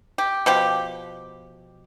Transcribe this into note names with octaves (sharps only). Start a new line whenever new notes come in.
G4
B2 F3 G4